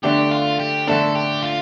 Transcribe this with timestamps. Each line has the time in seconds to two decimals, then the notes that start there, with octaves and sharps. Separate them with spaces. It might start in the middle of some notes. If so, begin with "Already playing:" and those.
0.03 D3 A3 D4 G4
0.31 F4
0.59 G4
0.87 D3 A3 D4 A4
1.15 G4
1.43 F4